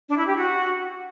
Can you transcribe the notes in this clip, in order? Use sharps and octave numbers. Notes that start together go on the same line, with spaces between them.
D4
E4
G4
F#4